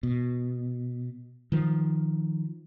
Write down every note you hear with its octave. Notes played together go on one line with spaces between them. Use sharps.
B2
D#3 F3